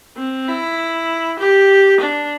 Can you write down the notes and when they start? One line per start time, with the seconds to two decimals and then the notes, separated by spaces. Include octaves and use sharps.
0.17 C4
0.48 E4
1.39 G4
2.00 D4